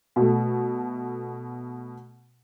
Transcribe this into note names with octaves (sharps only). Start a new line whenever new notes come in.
B2 A3